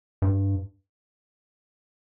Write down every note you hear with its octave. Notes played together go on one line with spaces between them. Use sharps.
G2